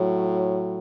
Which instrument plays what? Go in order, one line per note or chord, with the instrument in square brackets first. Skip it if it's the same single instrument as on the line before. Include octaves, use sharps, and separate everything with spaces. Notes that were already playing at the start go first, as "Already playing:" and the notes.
Already playing: [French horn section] A2 F#3